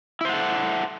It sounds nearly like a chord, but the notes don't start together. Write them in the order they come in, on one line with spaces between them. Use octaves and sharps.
E4 C5 F#5 A4